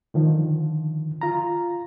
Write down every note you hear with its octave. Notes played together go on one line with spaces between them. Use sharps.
D3 D#3 F3
F4 A#5